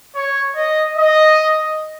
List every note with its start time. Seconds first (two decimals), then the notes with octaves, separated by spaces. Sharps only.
0.16 C#5
0.56 D#5
0.97 D#5